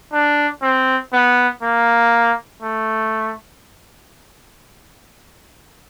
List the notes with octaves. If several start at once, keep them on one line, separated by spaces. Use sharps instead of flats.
D4
C4
B3
A#3
A3